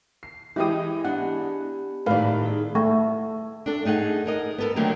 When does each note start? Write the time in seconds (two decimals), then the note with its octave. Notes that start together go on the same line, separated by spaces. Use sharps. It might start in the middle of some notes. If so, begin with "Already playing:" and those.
0.23 C7
0.56 E3 G#3 E4 G4 D#5 D#6
1.05 B3 D4 G4 F#5
2.06 A2 D#3 A4 B4 D5 F5
2.43 D#4 G#4
2.75 A3
3.66 D4 A4
3.85 A3 D#4 G#4 F#5
4.26 G#4 A#4 D#5
4.58 B3 A4 A#4
4.76 D3 D#3 F#3 G3 A3 A#3